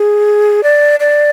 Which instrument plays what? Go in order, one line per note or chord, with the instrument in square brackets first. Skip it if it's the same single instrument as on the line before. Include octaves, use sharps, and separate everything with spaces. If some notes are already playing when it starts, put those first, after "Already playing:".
Already playing: [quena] G#4
D5
D5